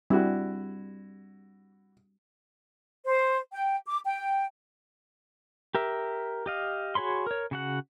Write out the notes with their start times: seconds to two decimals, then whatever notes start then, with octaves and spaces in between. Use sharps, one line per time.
0.10 G3 C4 D4 E4 F#4
3.06 C5
3.52 G5
3.87 D6
4.05 G5
5.75 G4 A#4 E5
6.46 G4 D#5 F5
6.95 F#4 G#4 C#5 B5 C6
7.27 A#4 C#5
7.51 C#3 F#4 F#5